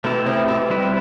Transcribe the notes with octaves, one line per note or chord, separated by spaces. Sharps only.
B2 A3 E4 G4
C3
B2
G3 C4 E4 B4